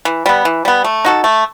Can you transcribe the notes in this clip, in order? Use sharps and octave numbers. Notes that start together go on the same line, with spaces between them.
E3
G3 B3
E3
G3 B3
A3
D#4 F#4 A4
A3